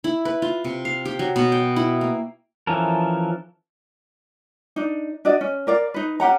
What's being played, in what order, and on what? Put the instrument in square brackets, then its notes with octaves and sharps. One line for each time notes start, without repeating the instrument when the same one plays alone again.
[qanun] E4
B4
F4
C3
F5
G4
F#3
B2
G5
E4
A#3
[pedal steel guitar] E3 F3 C#4 A4 A#4
[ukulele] D4 D#4
D4 F#4 D5 D#5
C#4
A#4 D5 F5
D#4 B4
C#4 G4 F#5 A#5